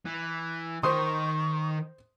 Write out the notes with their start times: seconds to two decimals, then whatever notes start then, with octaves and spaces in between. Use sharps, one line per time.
0.06 E3
0.83 D#3 A#4 C5 C6 C#6 D#6